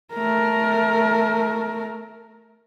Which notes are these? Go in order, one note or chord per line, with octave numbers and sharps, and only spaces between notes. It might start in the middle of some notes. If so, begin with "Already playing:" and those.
A3 A#4